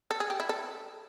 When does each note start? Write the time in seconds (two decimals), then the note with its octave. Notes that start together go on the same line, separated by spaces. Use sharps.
0.11 A4
0.20 G#4
0.30 G4
0.40 E4
0.49 A4